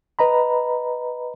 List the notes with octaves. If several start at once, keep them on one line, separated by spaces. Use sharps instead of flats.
B4 D#5 A#5 B5